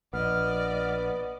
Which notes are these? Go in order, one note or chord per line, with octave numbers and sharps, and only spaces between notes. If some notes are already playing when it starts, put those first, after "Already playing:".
A#1 B3 D5 D#5 F6